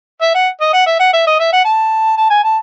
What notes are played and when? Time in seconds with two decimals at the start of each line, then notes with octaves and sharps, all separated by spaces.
0.21 E5
0.35 F#5
0.61 D#5
0.73 F#5
0.86 E5
1.00 F#5
1.13 E5
1.27 D#5
1.40 E5
1.53 F#5
1.65 A5
2.17 A5
2.30 G#5
2.44 A5